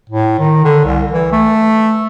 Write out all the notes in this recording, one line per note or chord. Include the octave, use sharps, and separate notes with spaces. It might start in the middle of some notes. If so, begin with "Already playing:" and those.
A2
D#3
D3
C2
E3
A3